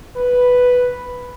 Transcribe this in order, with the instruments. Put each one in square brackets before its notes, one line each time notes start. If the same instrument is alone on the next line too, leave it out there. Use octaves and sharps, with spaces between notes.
[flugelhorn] B4